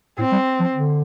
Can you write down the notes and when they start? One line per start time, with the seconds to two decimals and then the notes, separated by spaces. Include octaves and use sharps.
0.18 A2 C4
0.32 G3
0.60 F3
0.74 D3